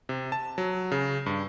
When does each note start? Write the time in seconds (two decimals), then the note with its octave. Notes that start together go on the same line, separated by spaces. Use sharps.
0.09 C3
0.32 A5
0.58 F#3
0.92 C#3
1.26 G2